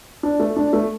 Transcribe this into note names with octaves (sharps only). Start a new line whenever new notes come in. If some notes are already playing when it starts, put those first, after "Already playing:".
D4
A3
D4
A3